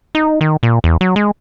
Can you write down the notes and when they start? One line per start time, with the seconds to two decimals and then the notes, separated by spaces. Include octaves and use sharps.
0.15 D#4
0.41 D#3
0.63 A#2
0.84 E2
1.01 F#3
1.16 G#3